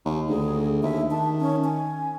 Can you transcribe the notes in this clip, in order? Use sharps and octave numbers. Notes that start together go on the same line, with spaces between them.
D#2
D2 G#4
D#2 E5
D#3 A5
C#4
G#5